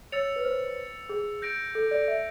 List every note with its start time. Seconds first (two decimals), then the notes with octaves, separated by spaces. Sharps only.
0.12 C#5 E6 A6 C#7 F7
0.36 B4
0.44 C5
1.09 G#4
1.42 G6 A#6 D7
1.75 A4
1.91 D5
2.08 E5